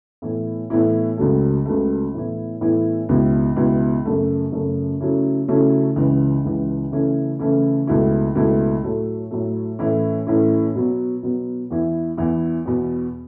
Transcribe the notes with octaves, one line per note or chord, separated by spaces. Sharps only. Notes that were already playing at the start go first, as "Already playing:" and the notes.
A2 E3 B3 E4
A2 E3 B3 E4
C#2 C#3 F#3 A3
C#2 C#3 F#3 A3
A2 E3 B3 E4
A2 E3 B3 E4
C#2 B2 B3 E4
C#2 B2 B3 E4
F#2 C#3 A3
F#2 C#3 A3
C#3 F#3 A3 C#4 E4
C#3 F#3 A3 C#4 E4
C#2 C#3 E3
C#2 C#3 E3
C#3 E3 A3 C#4 E4
C#3 E3 A3 C#4 E4
C#2 B2 A3 E4
C#2 B2 A3 E4
A2 F#3 A3
A2 F#3 A3
A2 E3 C#4 E4
A2 E3 C#4 E4
B2 F#3 B3
B2 F#3 B3
E2 E3 B3 E4
E2 E3 B3 E4
E2 B2 B3